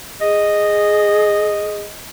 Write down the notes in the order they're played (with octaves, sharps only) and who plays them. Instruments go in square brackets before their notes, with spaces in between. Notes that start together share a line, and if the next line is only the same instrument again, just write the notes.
[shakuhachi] G#4 [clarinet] D#5